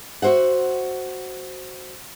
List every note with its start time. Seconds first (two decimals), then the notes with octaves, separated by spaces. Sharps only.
0.22 F#4 A4 C5 E5 F#5